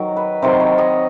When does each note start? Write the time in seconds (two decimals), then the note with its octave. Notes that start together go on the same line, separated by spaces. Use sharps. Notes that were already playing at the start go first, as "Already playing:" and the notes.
Already playing: D#3 F#3
0.16 B4
0.42 C3 D#3 F#3 C5
0.60 C#5
0.78 D#5